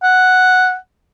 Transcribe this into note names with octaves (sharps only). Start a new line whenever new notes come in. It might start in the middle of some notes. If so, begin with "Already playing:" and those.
F#5